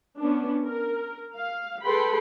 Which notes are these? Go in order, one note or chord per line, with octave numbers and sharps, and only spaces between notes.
B3 C#4 D4
A#4
F5
G#4 A4 B4 G5 B5 C6